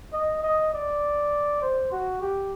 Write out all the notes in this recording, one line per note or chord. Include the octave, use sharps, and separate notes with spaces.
D#5
D#5
D5
C5
F#4
G4